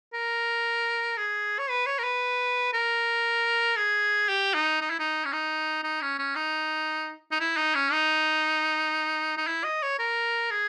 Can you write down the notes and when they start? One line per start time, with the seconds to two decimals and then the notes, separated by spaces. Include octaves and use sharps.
0.13 A#4
1.17 G#4
1.59 C#5
1.69 B4
1.86 C#5
1.99 A#4
2.04 B4
2.73 A#4
3.77 G#4
4.29 G4
4.54 D#4
4.81 D#4
4.90 E4
4.99 D#4
5.25 C#4
5.33 D#4
5.84 D#4
6.02 C#4
6.19 C#4
6.36 D#4
7.31 D#4
7.40 E4
7.57 D#4
7.75 C#4
7.92 D#4
9.37 D#4
9.47 E4
9.64 D#5
9.82 C#5
9.99 A#4
10.51 G#4